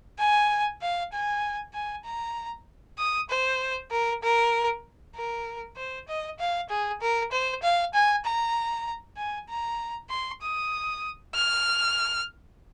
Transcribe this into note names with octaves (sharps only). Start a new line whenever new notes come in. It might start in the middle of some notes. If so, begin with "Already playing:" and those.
G#5
F5
G#5
G#5
A#5
D#6
C5
A#4
A#4
A#4
C5
D#5
F5
G#4
A#4
C5
F5
G#5
A#5
G#5
A#5
C6
D#6
F6